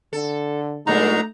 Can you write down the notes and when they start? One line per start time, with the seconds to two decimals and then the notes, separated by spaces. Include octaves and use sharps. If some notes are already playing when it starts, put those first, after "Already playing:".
0.13 D3 A4
0.87 A#2 F#3 G#3 A3 D4 D#4 A#5